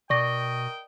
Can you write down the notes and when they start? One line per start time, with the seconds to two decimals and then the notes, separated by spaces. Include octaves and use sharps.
0.10 B2 A#4 D5 D#5 G5 C#6 A#6